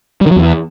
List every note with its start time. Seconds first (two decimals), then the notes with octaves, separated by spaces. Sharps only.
0.21 G3
0.26 D#3
0.31 F#3
0.36 E2